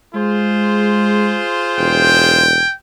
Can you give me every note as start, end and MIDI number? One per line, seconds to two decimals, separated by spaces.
0.15 1.40 56
0.15 2.50 65
0.15 2.50 68
0.15 2.50 72
1.78 2.62 28
1.78 2.73 79